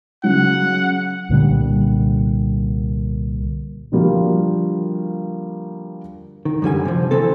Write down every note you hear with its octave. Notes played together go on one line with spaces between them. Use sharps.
C#3 F#3 F#5
C2 A#2 D3 G3
D3 F3 G3 A#3 F#4
D#3
F#2 D3 G3 G#5
C3 F3
D#3 E3 C4 A4